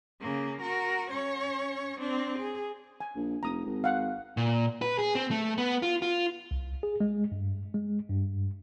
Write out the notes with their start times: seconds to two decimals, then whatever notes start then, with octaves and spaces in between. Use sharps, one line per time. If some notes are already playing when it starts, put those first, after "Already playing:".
0.21 C#3 A#3
0.62 F#4 A#4
1.11 C#4 C#5
1.99 C4 D4
2.39 G#4
3.00 G#5
3.15 A#1
3.43 F1 A#5 D#6
3.66 G#1
3.84 F5 F#5
4.37 A#2
4.82 B4
4.99 G#4
5.15 C4
5.31 A3
5.58 B3
5.82 F4
6.02 F4
6.51 C2
6.83 G#4
7.00 G#3
7.32 G2
7.75 G#3
8.09 G2